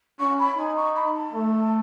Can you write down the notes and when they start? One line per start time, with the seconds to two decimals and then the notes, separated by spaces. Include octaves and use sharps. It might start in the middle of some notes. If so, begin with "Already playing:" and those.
0.20 C#4 C#6
0.39 B5
0.57 D#4 G#5
0.76 C#6
0.95 B5
1.14 A5
1.33 A3